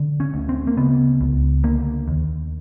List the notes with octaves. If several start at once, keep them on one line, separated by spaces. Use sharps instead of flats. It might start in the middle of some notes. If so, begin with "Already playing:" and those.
Already playing: D3
C#4
D2
C4
A#3
C#3 B3
C#2
D3 A#3
D#2